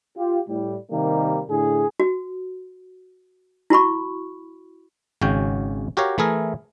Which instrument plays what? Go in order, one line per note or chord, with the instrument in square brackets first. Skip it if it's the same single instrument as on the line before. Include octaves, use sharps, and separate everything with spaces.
[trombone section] F4 G4
A2 G3
C3 D#3 G3 A#3
A2 D3 G#4
[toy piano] F#4
E4 F#4 B5 C#6
[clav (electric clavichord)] G#1 C#3 C#4 F#4 G5
F#4 G4 A#4 C#5 F5
E3 A3 E4 G#4 A#4